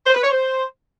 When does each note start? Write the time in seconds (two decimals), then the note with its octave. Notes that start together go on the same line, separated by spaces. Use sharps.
0.06 C5
0.14 B4
0.22 C#5
0.31 C5